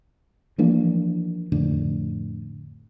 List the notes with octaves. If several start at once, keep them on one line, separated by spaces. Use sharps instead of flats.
E3 F3 A#3 D4
F2 A2 D3